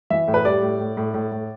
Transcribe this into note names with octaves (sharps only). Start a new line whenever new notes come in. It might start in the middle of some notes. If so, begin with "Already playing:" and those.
E3 E5
A2
B4
G3 D5
A2
A2
A2
A2
A2